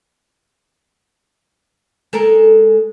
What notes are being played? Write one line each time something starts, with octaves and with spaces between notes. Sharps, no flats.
G#3 A4 A#4